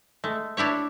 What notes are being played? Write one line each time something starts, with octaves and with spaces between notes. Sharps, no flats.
G#3 A3
D4 E4 G4 C#5